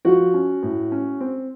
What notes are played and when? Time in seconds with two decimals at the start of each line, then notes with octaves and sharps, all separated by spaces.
0.05 F3 F#4
0.34 C#4
0.63 A2
0.92 C#4
1.20 C4